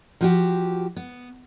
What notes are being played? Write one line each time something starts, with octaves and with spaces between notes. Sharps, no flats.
F3 F#4 G4
B3